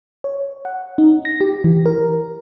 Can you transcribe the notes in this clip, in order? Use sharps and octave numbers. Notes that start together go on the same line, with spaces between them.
C#5
F#5
D#4
A#6
G4
E3
A#4